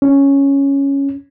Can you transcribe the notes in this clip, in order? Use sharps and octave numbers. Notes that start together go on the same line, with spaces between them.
C#4